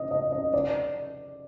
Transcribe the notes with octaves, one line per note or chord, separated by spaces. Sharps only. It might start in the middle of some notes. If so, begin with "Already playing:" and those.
Already playing: D#5
D#5
D#5
D5